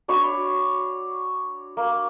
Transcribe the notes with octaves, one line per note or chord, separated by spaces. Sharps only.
D4 F#4 C#5 B5
A#3